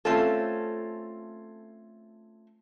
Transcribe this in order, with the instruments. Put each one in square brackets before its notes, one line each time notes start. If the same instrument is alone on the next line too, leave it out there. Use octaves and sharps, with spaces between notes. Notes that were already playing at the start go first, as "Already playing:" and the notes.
[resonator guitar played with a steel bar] A3 C4 C#4 F4 A4